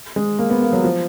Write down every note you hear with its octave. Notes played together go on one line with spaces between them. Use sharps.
G#3
A#3
B3
A#3
F#3
F3